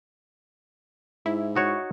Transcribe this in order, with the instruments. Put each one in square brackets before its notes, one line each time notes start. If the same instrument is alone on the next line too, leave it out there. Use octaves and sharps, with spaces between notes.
[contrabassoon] G#2 [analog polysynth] E4
[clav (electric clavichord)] D#4 F#4 C#5